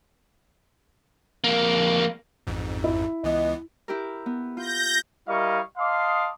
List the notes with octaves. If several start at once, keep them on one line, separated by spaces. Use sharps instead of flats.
F2 A#3
A1 F2 G#2
E4
C#2 E3 B3 D#5
E4 G4 A#4
B3
F4 G6 A#6
G3 E4 A#4 D#5 F5 C#6
D#5 F5 A5 C6 D6 D#6